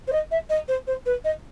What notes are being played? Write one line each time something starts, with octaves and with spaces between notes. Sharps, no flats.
C5
D#5
E5
D#5
C5
C5
B4
D#5